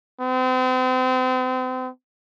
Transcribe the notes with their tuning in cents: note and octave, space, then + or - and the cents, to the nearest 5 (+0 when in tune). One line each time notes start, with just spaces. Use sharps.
C4 -40